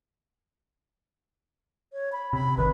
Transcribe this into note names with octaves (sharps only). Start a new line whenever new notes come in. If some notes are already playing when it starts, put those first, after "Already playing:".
C#5
B5
C3 B5
G#1 D#3 B4